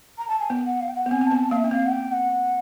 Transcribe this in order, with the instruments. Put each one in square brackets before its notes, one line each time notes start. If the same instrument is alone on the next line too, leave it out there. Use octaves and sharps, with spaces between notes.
[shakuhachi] A#5
A5
G#5
[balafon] B3 [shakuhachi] G5
[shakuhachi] F#5
F5
G5
F#5
[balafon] B3
[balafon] C4 [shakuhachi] G#5
[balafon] C4 [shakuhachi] A5
[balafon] B3 [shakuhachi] G#5
[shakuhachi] A5
[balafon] A#3 [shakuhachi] F5
[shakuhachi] E5
[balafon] C#4
[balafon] C4 [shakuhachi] F5
[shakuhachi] F#5
G5
F#5